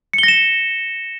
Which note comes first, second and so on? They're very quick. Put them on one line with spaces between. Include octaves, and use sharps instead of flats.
C#7 G7 A#6 E7